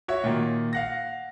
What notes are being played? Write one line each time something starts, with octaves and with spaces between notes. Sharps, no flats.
F#4 C#5 E5
A#2 D#3
F5 F#5 A#6